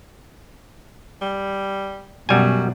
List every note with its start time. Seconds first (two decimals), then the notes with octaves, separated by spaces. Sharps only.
1.22 G3
2.29 F#2 B2 G3 F#4 G#5